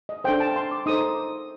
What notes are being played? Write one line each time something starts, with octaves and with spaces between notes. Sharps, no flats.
D#5
D4 A4 C5 G5
A5
C6
D6
D#4 A4 C5 D#6